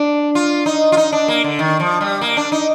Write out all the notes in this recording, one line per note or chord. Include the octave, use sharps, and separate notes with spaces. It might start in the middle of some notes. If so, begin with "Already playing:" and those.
Already playing: D4
F4
D#4
F4
D#4
D4
A#3
D3
D#3
F3
G3
A#3
D4
D#4